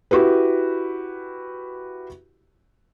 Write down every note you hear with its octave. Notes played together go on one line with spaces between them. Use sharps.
E4 F#4 G4 B4